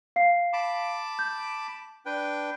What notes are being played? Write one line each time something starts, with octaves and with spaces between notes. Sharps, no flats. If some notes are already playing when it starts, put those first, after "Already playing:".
F5 C7
A5 B5 D6
G6
D4 B4 G5